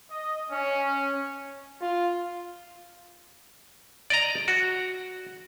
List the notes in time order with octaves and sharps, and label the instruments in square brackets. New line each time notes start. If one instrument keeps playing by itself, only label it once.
[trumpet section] D#5
C#4
[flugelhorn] F4
[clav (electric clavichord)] D5 D#5 A#5
F#4